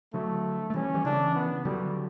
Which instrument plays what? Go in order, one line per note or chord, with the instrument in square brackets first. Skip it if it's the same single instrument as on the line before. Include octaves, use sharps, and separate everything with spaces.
[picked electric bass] D3 F#3 [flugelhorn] A3
[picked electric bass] A3
[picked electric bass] E3 G3 [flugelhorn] C#4
[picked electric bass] E3 G3
[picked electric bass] C#3 E3 [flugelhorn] D4
[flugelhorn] B3
[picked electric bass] D3 F#3 [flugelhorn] G3